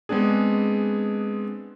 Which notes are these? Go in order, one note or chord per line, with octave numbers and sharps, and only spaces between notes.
G#3 B3 C4 D4 G#4